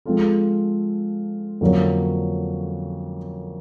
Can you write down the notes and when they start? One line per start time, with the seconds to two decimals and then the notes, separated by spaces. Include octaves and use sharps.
0.05 F3 G#3 C4 F4 A4
1.61 F2 D3 F#3 A#3 C#4